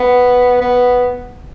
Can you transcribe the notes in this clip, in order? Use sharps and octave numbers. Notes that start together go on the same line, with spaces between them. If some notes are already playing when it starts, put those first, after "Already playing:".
Already playing: B3
B3